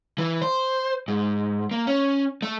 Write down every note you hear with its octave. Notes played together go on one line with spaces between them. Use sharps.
E3
C5
G#2
A#3
C#4
A3